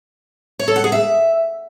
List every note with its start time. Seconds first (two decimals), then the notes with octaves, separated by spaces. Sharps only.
0.59 C#5
0.68 A4
0.76 F#5
0.84 G#4
0.92 E5